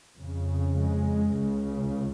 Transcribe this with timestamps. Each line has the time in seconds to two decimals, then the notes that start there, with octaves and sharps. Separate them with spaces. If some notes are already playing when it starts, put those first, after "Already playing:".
0.19 F2 C#3
0.75 G#3
1.31 C#2 C#3